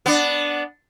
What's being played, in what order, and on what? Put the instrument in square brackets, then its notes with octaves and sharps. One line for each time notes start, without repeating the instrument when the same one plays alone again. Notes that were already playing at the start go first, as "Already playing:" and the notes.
[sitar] B3 D4